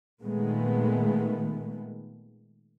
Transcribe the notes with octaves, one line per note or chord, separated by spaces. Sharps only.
A#2 D#3 G#3 A3 B3